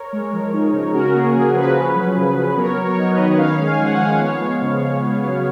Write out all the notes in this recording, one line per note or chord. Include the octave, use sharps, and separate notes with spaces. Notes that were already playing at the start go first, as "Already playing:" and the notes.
Already playing: A#4 C#5
G#3
F3
D#4
C#3
C#4 F#4 A#4
A#3 G#4
F3 G#4
F3 G#4 B4
C#4
F#3
C#3
C#3
B3 A#4 C#5
F#3
A#4 C#5
D#4
B4 D#5
D#3
C#4 C#5 F5
G#3
F5 G#5
F3 F#5
F5 G#5
F3
B3 C#5 F5
G#3
C#3
C#3
B3
F#3